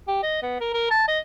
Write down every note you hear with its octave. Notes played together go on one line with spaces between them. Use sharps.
G4
D#5
B3
A#4
A#4
A5
D#5